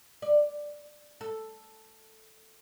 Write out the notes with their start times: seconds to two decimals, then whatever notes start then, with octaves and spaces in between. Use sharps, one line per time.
0.22 D5
1.21 A4